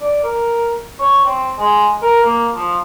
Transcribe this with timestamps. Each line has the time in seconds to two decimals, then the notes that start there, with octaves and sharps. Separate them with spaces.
0.01 D5
0.23 A#4
0.99 C#5
1.25 C4
1.59 G#3
2.02 A#4
2.23 A#3
2.54 F3